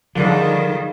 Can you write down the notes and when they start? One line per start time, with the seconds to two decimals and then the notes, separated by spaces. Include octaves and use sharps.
0.15 D3 D#3 F3 G3 G#4 A#4 F5